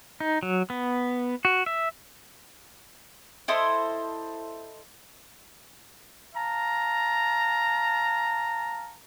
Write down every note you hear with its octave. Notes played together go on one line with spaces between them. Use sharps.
D#4
F#3
B3
F#4
E5
E4 A4 C5 D#5
F5 A5 A#5